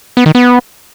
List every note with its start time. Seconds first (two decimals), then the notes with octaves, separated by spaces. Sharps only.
0.17 B3
0.26 D#3
0.35 B3